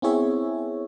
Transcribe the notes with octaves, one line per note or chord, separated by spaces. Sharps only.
B3 C4 E4 G#4 C#5 E5